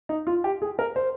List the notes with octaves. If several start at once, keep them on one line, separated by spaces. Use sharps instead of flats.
D#4
F4
G4
G#4
A#4
C5